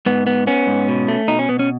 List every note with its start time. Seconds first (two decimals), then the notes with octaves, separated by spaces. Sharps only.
0.06 G#2 B3
0.27 B3
0.47 B3 C#4
0.67 G#2
0.88 B2
1.08 A3
1.28 B2 D#4
1.39 C#4
1.49 B2 B3
1.59 C#4